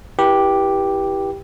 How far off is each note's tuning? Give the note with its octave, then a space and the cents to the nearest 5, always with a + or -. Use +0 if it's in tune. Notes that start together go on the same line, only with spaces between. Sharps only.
E4 +0 G4 +0 B4 -30